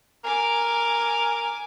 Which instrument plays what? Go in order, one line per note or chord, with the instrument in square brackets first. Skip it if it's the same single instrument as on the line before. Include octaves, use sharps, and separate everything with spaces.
[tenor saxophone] A#4 [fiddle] G#5 D6